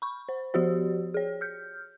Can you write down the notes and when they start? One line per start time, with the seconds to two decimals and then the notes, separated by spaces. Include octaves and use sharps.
0.02 B5 C#6
0.29 C5
0.54 F3 F#4 G4 C5
1.14 G#4 C#5
1.41 F6 G6